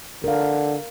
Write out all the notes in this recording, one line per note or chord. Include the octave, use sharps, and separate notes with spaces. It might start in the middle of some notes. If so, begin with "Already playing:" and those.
D3 A#4 F5